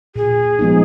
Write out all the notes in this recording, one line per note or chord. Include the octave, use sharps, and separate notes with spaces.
A#2 G#4
F3 G#3 B3 D#4